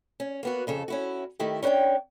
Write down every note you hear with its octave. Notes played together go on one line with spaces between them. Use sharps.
C#4
A#3 B3 F#4
F2 C#3 A4
C#4 E4 F#4
D#3 A3 E4 G4
C#4 D4 A#4 C#5 G5